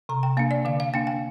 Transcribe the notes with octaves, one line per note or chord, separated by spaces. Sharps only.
C3 A#5
G5
A#3 D4 F5
D5
D3 F5
F5
A#3 D4 G5
G5